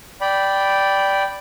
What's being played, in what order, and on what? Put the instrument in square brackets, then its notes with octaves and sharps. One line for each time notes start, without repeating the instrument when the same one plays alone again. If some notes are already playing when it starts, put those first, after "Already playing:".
[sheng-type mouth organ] D5 G5 B5